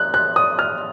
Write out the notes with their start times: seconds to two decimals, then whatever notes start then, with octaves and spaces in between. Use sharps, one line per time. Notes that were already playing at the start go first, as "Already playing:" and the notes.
Already playing: F#6
0.14 F#6
0.36 D#6
0.59 F6